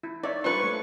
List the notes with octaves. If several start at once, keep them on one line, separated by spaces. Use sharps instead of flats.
E4
D#4 C#5 D5 E5
G3 D4 F4 B4 C5 C#6
A3 C#5